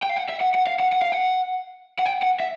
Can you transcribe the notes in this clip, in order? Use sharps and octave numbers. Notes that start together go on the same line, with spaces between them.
G5
F5
F#5
E5
F#5
F#5
F5
F#5
F#5
F5
F#5
F#5
G5
F#5
E5